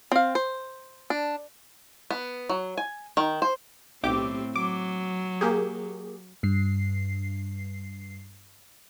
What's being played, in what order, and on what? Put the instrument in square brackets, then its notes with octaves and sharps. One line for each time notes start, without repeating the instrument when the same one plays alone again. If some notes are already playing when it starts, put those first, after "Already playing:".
[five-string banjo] C4 F5
C5
D4
B3
F#3
G#5
D#3
C5
[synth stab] B1 G4 D6 [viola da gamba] A2 C4
[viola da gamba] F#3 [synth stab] D6
[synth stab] A#3 G4 G#4
[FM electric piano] G2 C7